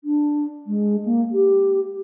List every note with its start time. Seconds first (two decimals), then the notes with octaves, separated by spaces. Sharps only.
0.04 D4
0.67 G#3
1.05 A#3
1.32 G4